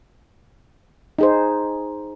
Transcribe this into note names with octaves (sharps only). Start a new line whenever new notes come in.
D#4 G#4 C5